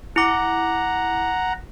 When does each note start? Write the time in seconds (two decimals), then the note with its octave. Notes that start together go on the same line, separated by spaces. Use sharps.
0.16 E4 F#5 A#5 D6